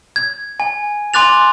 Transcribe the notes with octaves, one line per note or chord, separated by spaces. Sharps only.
G#6
G#5
G#5 C6 D6 F#6 A6 F7